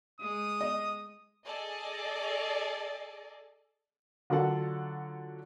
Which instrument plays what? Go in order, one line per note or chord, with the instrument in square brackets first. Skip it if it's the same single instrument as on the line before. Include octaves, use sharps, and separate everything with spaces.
[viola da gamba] G#3 [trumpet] D#6
[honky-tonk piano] D#5
[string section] G#4 A4 D5 D#5
[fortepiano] D3 F#3 F4 A4 F#5 A5